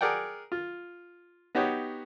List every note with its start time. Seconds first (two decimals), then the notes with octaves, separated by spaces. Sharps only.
0.01 G#4 A#4 D5 F#5 G5
0.52 F4
1.55 B3 D#4 F#4 G4 C#5